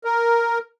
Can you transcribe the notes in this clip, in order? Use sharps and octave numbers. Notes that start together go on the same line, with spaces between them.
A#4